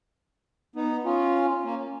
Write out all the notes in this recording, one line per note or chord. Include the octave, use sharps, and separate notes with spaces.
B3 D#4
C#4 F4
A#3 C#4